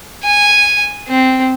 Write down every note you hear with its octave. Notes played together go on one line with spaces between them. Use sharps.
G#5
C4